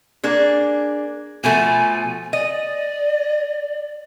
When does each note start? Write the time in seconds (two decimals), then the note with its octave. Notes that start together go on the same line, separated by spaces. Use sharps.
0.24 A#3 D4 G#4
1.44 B2 F3 A3 G#5
2.33 D5 D#5